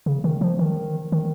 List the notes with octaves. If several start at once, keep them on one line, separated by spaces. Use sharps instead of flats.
C#3
D#3
F3
D#3
D#3